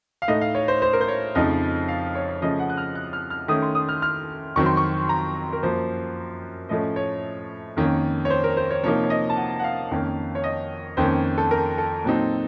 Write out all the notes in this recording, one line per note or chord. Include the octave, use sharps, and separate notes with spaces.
F5
A2 A3 D#4 D#5
F5
C#5
C5
C5
A#4
C5
C#5
F2 C#3 F3 A3 D#4 D#5
F5
C#5
C#3 F3 A3 C#4 D#5
F#5
F#6
F6
F#6
F6
F6
D#3 A3 C#4 D#6
C6
D#6
F6
F6
F2 D#3 F#3 C4 C#6
C6
C#6
A#5
A#4
F#2 F3 A#3 C5
A2 F3 A3 C#4 D#5
C#5
F2 D#3 A#3 C#4
C#5
C5
A#4
C5
C#5
C3 F3 A#3 D#4 C#5
C#5
D#5
A5
F#5
F#5
F5
F2 D#3 A#3 C#4
C#5
D#5
F2 D#3 A#3 C#4 C5
A4
A#4
A4
A#2 F#3 C4 D#4